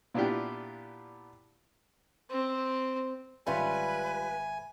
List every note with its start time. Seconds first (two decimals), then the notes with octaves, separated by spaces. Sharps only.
0.14 A#2 B3 D4 E4 F4 G4
2.30 C4
3.47 G#1 G3 C#4 F4 B4 E5 G#5 B5